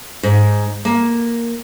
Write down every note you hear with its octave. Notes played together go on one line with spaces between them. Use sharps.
G#2
A#3